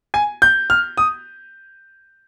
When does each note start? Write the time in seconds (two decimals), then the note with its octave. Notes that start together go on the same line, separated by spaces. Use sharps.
0.14 G#5
0.42 G6
0.70 F6
0.97 D#6